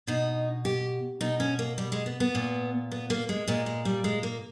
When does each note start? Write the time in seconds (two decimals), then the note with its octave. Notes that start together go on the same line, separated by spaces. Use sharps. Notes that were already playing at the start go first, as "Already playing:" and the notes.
0.07 B2 D#4
0.65 G4
1.21 B2 D#4
1.40 C#4
1.59 A#3
1.78 G3
1.92 G#3
2.06 B3
2.20 B3
2.35 A#2
2.92 B3
3.10 A#3
3.29 G#3
3.48 A#2 G#3
3.66 G#3
3.85 G3
4.04 G#3
4.23 A#3